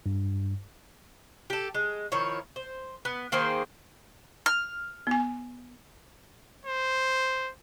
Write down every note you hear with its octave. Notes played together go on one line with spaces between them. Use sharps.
G2
G4 A4
G#3
D#3 F3 E4 C#5
C5
B3
D#3 A#3 G#4 C5
F6
B3 G#5
C5